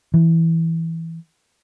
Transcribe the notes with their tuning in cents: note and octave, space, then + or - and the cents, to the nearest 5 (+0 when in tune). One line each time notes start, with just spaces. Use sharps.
E3 -5